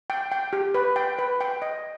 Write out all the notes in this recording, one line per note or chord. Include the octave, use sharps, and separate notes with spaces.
G5
G5
G4
B4
G5
B4
G5
D#5